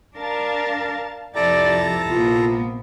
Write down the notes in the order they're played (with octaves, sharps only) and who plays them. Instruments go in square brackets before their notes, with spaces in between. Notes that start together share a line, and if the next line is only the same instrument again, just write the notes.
[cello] D4 A#4 [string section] F5 A5 A6
[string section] C2 F2 A6 [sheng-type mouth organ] E4 A4 A#5 [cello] G4 [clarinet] D5
[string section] A#1 C3 [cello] A#3 B3 [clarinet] F4